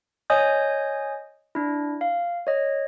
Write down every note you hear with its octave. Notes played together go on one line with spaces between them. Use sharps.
C#5 D#5 G#5 D#6 G6
D4 E4
F5
C#5 D#5